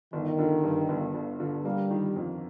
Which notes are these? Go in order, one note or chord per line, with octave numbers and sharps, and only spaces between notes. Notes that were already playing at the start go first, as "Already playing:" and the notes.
G1 D#3
D3
G2
G1
G1
D3
G3 A#3
D#3
F2